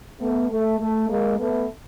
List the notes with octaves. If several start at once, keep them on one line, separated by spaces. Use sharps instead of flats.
A3 B3
A3
A3
G#3 A#3
A3 B3